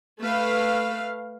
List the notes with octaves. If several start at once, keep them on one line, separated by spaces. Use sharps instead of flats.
A3 B4 F5